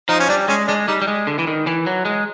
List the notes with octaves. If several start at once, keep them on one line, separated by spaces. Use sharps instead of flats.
F3 D#4
C#4
G3 D4
G#3 C#4
G#3 D4
G3 D#4
G3
G#3
D3
E3
D#3
E3
F#3
G#3